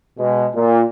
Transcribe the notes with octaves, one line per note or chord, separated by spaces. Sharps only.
B2 G#3
A#2